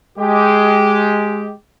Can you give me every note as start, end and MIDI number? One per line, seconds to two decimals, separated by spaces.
0.18 1.52 56
0.18 1.52 67